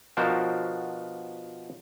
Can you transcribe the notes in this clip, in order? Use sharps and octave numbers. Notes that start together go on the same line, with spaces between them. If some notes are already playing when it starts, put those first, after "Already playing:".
B2 F3 D4 F#4 A#4 C5